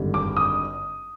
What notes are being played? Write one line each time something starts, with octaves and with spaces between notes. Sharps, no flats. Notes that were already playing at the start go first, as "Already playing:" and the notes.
Already playing: G#1 G2 D3
D6
D#6